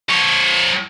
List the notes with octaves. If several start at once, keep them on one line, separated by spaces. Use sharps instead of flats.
F3 C#5